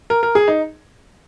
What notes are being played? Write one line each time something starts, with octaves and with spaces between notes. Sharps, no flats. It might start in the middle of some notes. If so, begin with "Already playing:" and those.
A#4
A#4
G#4
D#4